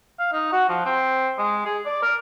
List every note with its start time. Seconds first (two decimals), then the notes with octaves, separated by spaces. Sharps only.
0.19 F5
0.32 D#4
0.52 F#4
0.69 F3
0.85 C4
1.38 G#3
1.65 G#4
1.86 D5
2.02 A#4